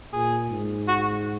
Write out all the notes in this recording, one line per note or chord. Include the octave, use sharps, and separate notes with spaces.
A#2 G#4
G#2
F#4